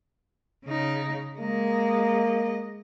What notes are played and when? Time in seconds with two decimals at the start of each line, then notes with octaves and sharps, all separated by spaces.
0.65 C#3 D#4
1.39 G#3 A#3 D#5